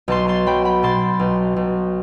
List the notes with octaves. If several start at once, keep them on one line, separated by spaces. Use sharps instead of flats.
B1 A5 C6
A5 C6
F#3 G5 B5
G5 B5
B2 A5 C6
B1
B1